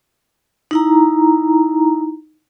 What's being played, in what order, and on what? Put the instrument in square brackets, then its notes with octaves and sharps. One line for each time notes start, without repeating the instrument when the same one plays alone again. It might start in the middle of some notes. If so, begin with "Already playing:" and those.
[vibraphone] D#4 E4 A#5